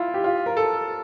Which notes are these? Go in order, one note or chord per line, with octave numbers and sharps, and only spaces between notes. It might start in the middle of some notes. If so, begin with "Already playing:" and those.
Already playing: E4 F4
G4
F4
A#4
A4